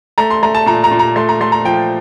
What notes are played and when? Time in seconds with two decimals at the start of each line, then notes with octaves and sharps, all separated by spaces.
0.18 A3 A#5
0.30 C6
0.43 A3 A#5
0.55 A5
0.66 A#2 A#5
0.84 A#5
0.91 A#2
0.99 A#5
1.16 A3 C6
1.29 A#5
1.41 A3 C6
1.52 A#5
1.65 F3 G5